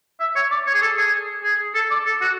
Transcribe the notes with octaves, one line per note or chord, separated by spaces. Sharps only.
E5
C#5
D5
C#5
G#4
A4
G#4
G#4
A4
D5
A4
F#4